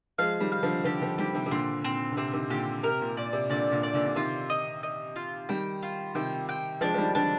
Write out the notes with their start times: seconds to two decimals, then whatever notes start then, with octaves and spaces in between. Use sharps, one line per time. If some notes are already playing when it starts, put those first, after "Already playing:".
0.18 F3 G#3 F5
0.40 D#3 G3
0.52 F5
0.63 D3 F3
0.84 D3 F3 G4
1.02 D3 F3
1.18 D#3 G3 G4
1.34 C3 D#3
1.46 C3
1.51 A#2 D3 C4
1.84 A#2 C4
2.12 D3
2.17 C3 C4
2.33 C3 D#3
2.50 A#2 D3 G4
2.83 C3 A#4
3.01 A#2
3.17 A#2 D5
3.33 C3
3.49 A#2 D3 D5
3.72 A#2 D3
3.83 D5
3.94 A#2 D3
4.06 D3
4.16 C3 D#3 F4
4.50 D#5
4.83 D#5
5.16 F4
5.49 D#3 G3 G5
5.83 F4
6.15 C3 D#3 G5
6.49 G5
6.81 F3 G#3 D4
6.94 F3
6.98 D#3 G3
7.15 D3 F3 D4